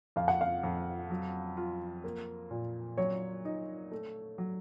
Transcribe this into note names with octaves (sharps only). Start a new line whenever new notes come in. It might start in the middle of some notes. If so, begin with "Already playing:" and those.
F2 F5
F#5
F5
F2
F#3
F4
A#3
A#2
F#3 C#5
D#4
A3
F#3